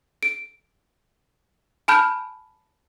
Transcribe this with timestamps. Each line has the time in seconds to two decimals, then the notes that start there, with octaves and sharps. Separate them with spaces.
0.23 D7
1.88 G#5 A5 B5 F6 G6